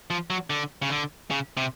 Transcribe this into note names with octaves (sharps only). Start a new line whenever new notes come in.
F3
F#3
D3
C#3
D3
C#3
C3